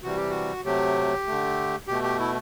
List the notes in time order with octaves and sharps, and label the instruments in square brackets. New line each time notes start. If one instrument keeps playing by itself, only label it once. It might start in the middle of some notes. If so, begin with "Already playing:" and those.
[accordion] C3 E3 G3 F#4
G4
F#4
C3 F#3 A3 G4
D3 A3
B2 A3 G4
G4
E4